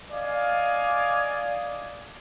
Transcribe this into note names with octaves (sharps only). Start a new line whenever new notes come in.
D5 D#5 F5 G#5